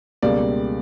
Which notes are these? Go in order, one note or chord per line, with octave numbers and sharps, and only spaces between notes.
C#2 B2 G3 A#3 D5